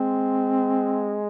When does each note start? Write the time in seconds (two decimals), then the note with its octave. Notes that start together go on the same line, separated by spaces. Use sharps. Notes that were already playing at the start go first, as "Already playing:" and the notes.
Already playing: G#3 C4